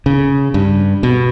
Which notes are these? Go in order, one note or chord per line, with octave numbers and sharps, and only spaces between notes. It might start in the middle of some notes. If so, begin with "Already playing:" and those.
C#3
G2
B2